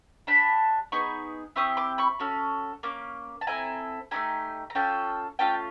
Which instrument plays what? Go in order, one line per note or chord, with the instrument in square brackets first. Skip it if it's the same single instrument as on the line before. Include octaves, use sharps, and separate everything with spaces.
[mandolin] D4 G4 A5 B5
B3 D#4 G#4 B5 C#6
C4 E4 G4 C#6 D#6
C6 D6
B5 C#6
C#4 F#4 A4
A#3 C#4 D6
A5
C4 E4 A4 G#5 A#5
A3 C4 D#4 G4 G#5 A#5
A#5
C#4 F4 A4 G5 A5
A3 C#4 F4 G5 A5